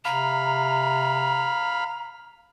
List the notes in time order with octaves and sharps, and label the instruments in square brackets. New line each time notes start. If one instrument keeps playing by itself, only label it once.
[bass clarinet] C3 [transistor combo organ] F5 B5 [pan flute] A#5